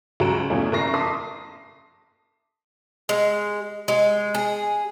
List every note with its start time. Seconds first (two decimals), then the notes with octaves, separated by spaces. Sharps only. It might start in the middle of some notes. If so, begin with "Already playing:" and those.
0.20 C#2 F#3 F#4 A#5 D7 E7
0.50 E2 B2 F3 A3 C#4 E4
0.72 F#1 A#4 A#5 C#6 A#6 C7
0.94 A5 C6 D6 D#6 B6 C7
3.09 G#3
3.88 G#3
4.34 G#4